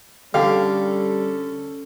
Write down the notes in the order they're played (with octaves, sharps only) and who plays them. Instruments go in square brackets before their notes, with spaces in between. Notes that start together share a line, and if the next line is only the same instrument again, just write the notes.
[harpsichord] D3 [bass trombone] G3 [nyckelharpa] C#4 A4 [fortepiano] G4 F5